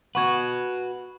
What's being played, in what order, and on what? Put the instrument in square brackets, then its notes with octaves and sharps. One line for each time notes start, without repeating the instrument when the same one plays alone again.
[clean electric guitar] F#4 B4 [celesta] F#5 C#6 G#6